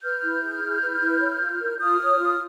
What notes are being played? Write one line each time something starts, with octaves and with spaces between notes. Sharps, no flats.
B4 F6 G6
E4
G#4
E4
B4
E4
C#5
F4
A#4
F4 D#6 F6
C#5
F4